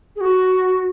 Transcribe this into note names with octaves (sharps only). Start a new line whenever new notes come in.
G#4
F#4